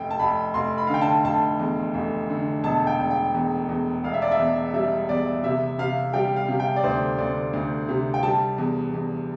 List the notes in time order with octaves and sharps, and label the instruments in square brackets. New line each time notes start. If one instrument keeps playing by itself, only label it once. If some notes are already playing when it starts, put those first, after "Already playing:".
Already playing: [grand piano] F1 G5
A5
F1 B5
F1 C6
B5
F5
D3 G5
A5
F1 A5
E2
F1
D3
E1 A5
G5
E1
G5
E2
E2
E1 F5
E5
D5
E5
E2
G3 E5
E2 D5
C3 E5
C3 F5
G3 G5
F5
C3
G5
D5
D2 C5
D2 D5
D2
C3
G5
G3 A5
E2
E2